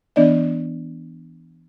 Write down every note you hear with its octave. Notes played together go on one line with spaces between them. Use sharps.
E3 B3 D4 D5 D#5